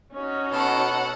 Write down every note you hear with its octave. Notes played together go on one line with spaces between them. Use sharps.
C#4 D#4 F#4
B2 A4 F#5